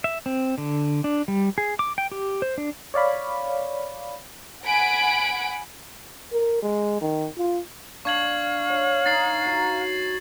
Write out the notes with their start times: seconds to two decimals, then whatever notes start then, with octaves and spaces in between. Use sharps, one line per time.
0.04 E5
0.26 C4
0.58 D3
1.04 D4
1.28 G3
1.58 G#4
1.79 D6
1.98 G5
2.12 G4
2.42 C5
2.58 D4
2.94 C#5 D5 F5 B5
4.65 F#5 G#5 B5 D7
6.32 A#4
6.62 G#3
7.02 D#3
7.38 F4
8.05 D4 F5 C#6 G#6 F#7
8.70 C#5
9.06 D#4 A6 C7 F#7
9.45 F#4 A#5